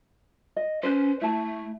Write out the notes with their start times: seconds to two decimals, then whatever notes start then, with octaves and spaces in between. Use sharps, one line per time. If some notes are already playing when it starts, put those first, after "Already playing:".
0.56 D#5
0.83 C#4 B4 C5
1.21 A3 E4 A5